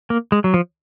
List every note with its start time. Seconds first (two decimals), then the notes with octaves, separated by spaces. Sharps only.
0.10 A#3
0.32 G#3
0.44 F#3
0.54 F3